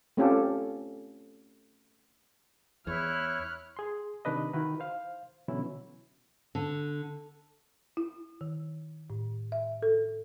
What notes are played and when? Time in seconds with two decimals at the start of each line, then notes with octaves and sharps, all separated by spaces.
0.17 A3 C4 C#4 F4 G4 A4
2.87 E2 E4 C#5 F6 F#6
3.77 G#4 C6
4.25 C3 D#3 D4 B4 D#5
4.54 D#3 E4 F#4 A#4 B4
4.80 C5 F5
5.48 B2 D3 E3 F#3 C#4 E4
6.55 D3
7.97 E4
8.41 D#3
9.10 A2
9.52 E5
9.82 A4